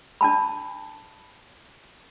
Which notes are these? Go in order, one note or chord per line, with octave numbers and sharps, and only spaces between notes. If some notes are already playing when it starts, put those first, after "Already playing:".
D4 A5 B5